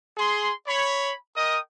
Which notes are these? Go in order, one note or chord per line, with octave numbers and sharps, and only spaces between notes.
G#4 C6
C#5 B5
A#4 D#5 G5 D#6